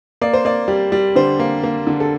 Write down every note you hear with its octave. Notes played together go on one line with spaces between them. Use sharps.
A#3 D5
C5
A#3 D5
G3
G3
D3 C5
A#3
A#3
D3
A4